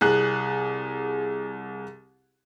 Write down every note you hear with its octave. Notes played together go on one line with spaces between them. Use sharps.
C2 G#4 F#6